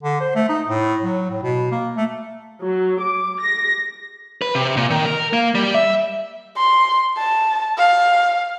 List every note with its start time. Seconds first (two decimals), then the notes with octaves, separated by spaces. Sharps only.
0.03 D3
0.20 C5
0.35 A3
0.49 D#4
0.68 A2
1.03 F#3
1.30 A2
1.43 B2
1.72 A#3
1.97 A3
2.62 F#3
2.99 D6
3.40 A#6
4.42 B4
4.55 C3
4.77 A#2
4.90 D#3
5.05 A#4
5.33 A#3
5.55 G3
5.74 E5
6.57 C6
7.18 A5
7.78 F5